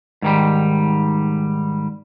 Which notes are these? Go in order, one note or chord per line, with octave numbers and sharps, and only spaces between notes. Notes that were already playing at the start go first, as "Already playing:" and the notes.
G#2 D#3 G3